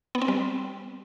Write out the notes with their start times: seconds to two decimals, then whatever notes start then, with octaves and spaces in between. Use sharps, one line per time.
0.15 B3
0.22 C4
0.28 G3